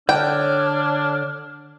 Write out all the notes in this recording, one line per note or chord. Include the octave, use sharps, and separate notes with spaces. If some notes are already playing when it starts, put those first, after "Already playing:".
D3 D4 C#5 G5 F6